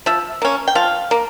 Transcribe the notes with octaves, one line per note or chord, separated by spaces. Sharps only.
F3 E5
A#3 C#4
G5
F3 F5
A#3